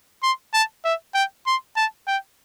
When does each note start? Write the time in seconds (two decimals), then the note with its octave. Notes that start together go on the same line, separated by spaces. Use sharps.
0.23 C6
0.53 A5
0.85 E5
1.14 G5
1.47 C6
1.76 A5
2.08 G5